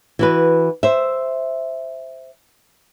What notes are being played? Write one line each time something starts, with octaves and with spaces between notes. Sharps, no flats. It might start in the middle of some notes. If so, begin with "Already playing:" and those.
E3 F#4 B4
C5 E5